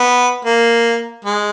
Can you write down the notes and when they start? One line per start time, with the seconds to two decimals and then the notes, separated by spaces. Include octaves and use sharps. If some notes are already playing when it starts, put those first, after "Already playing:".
Already playing: B3
0.45 A#3
1.25 G#3